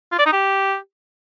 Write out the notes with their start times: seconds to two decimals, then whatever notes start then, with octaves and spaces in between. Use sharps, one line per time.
0.12 F4
0.19 D5
0.26 D#4
0.33 G4